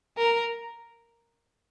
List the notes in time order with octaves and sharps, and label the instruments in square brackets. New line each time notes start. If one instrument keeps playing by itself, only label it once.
[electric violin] A#4